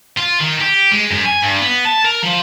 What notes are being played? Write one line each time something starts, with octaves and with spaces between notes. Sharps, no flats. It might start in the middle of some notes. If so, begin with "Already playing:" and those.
F4
D#3
G4
G#3
F#2
G#5
G2
B3
A5
A#4
F3